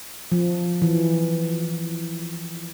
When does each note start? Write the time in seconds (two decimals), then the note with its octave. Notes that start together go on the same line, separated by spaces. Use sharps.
0.32 F3
0.82 E3